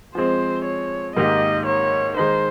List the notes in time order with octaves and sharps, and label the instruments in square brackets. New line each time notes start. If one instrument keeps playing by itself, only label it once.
[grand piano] F3 G#3 C4 [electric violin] C5
[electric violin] C#5
[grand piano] G#2 D#3 A#3 D#4 G4 [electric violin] D#5
[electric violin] C#5
[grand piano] D#3 G#3 D#4 [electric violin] C5